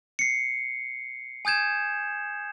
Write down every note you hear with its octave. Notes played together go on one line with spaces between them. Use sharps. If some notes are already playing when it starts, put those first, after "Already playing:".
C7 C#7
G#5 D#6 G6 G#6 E7